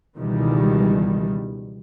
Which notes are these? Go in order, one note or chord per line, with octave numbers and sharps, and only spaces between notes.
C#2 B2 D#3 E3 G3 G#3